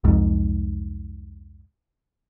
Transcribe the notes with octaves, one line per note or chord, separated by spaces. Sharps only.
C2 F2 G#2